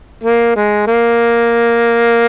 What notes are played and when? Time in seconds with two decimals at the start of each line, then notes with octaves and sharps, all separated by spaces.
0.24 A#3
0.56 G#3
0.87 A#3